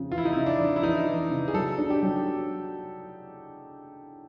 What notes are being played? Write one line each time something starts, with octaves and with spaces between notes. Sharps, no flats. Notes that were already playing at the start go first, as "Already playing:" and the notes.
Already playing: F2 C#3
E3 F4
E4
D#4
C#3 E4
D4
F2
E4
E3 D#4
E3
C#3
G#4
F#3 A4
D4
G4
F#3